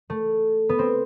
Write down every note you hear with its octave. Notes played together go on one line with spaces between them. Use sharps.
A3
B3
C4